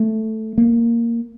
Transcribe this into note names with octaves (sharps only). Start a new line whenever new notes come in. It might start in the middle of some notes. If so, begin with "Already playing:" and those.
Already playing: A3
A#3